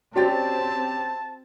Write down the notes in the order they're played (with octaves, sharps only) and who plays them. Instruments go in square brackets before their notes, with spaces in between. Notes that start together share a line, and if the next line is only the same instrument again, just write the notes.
[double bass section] C4 [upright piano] C#4 G4 A6 [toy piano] F#4 D5 [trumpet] A5